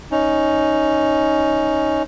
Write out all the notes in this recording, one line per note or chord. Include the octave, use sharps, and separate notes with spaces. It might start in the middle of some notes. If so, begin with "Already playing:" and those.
C#4 D#4